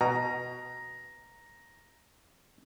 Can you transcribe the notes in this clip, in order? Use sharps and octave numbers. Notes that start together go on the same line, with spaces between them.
B2 A#5